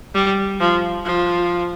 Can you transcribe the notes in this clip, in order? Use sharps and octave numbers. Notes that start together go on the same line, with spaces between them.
G3
F3
F3